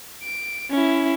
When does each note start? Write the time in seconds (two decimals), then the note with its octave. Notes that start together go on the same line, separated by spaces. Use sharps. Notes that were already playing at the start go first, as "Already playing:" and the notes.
0.23 D7
0.71 C#4 E4